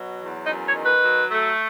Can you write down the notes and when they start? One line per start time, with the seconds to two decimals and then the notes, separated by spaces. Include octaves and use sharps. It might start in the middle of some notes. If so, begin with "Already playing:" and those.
Already playing: B2 F#3
0.18 E2
0.46 F#2 D#4
0.65 C#5
0.75 D#3
0.83 B4
1.02 F#3
1.31 A3